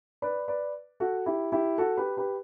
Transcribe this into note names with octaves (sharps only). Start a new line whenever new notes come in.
B4 D5
B4 D5
F#4 A4
E4 G4
E4 G4
F#4 A4
G4 B4
G4 B4